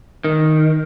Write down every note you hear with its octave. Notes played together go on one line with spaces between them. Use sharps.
D#3